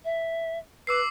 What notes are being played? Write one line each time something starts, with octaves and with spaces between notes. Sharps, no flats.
E5
B4 D6 E6 C7